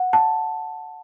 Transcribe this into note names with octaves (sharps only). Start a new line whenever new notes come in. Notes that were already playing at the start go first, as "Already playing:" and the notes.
Already playing: F#5
A5